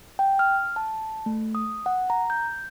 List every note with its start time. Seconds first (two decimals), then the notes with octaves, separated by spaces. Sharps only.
0.19 G5
0.39 F6
0.76 A5
1.26 A3
1.55 D#6
1.86 F#5
2.10 A#5
2.30 G6